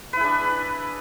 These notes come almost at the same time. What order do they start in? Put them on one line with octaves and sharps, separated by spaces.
B4 E4 G#4 D4